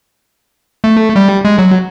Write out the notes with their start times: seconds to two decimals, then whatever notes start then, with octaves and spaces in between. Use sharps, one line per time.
0.84 A3
1.16 G3
1.45 G#3
1.59 F#3